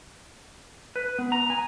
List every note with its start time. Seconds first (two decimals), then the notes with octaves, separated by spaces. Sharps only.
0.96 B4
1.19 B3
1.32 A#5
1.50 G#5